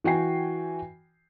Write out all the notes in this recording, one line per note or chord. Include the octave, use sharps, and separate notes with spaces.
E3 F#4 G5 G#5 C7